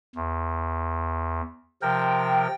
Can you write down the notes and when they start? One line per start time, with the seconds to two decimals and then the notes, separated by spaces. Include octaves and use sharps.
0.15 E2
1.82 C3 F3 A#4 G5